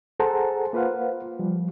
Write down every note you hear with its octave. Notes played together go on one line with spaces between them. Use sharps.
G#4 A4 C5 F#5 A5 A#5
A#3 F4 B4 C5 F5 F#5
F3 G3